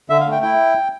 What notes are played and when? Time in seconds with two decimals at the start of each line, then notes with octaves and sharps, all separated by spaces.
0.10 D3 E5
0.20 F5
0.26 A3
0.31 G5
0.42 E4 G5